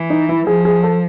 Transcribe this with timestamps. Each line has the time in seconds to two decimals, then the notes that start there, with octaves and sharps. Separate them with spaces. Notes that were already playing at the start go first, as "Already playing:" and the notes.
Already playing: E3
0.10 D#4
0.29 E4
0.47 F3 G#4
0.65 G#4
0.83 A4